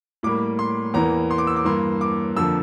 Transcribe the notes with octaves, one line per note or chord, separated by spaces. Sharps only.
A2 G3 A#3 D6
C6
E2 E3 A#3 A#5
C6
D6
E6
D6
G2 E3 A#3 C6
D6
F2 D3 F3 A#3 E6